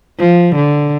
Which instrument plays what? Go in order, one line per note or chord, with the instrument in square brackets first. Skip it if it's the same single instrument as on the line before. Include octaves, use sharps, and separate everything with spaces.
[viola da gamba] F3
D3